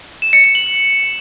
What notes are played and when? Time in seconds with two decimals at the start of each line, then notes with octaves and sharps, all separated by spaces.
0.22 E7
0.33 C#7
0.44 C#7
0.55 F#7